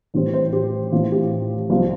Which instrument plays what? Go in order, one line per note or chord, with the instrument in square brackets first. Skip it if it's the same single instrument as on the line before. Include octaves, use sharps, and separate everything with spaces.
[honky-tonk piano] A1 A2 G3 C4
C5
G4
A1 A2 A3 C4 F4
G4
C2 C3 F3 C4 F4